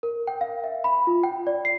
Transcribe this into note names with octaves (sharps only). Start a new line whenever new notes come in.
A#4
G5
F5
E5
B5
F4
G5
D5
C7